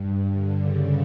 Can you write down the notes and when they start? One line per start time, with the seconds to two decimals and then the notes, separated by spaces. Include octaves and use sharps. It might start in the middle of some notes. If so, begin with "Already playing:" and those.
Already playing: G2
0.27 D3
0.58 C#3